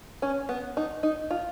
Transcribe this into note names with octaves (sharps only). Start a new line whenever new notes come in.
C#4
B3
D#4
D#4
F4